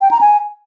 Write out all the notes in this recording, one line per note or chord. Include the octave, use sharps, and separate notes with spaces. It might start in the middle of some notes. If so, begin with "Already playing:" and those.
G5
A#5
G#5